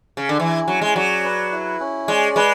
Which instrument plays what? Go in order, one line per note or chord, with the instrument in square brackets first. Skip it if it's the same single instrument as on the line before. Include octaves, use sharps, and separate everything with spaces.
[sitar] C#3
D3
[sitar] E3 [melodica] E4
[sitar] F#3 [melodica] C#4
[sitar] G#3
[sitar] F#3 [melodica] D5
[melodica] B4
E4
C#4
[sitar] G#3 [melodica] D5
[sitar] G#3 [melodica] B4